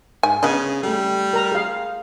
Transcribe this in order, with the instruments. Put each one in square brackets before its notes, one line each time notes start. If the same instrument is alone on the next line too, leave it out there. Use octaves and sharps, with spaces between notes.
[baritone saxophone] G#2 [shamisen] G#5
[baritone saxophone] C#3 [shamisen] B3 D#5 [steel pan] D4 G#5
[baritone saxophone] G3 [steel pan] A3 A4
[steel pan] A#4 A#5
G#4 F5